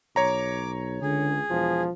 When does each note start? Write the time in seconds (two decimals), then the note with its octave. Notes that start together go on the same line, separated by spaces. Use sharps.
0.16 B1 C#5 A#5 D6
1.02 C#2 D3 G#4
1.50 E1 F3